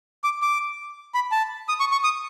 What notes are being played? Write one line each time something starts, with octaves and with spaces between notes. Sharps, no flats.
D6
D6
B5
A5
D#6
C#6
C#6
D#6